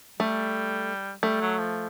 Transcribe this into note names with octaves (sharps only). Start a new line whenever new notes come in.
G3 A3
G3 A3
F#3
F3